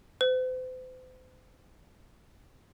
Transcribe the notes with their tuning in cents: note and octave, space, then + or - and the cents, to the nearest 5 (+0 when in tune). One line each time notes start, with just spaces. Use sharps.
C5 -40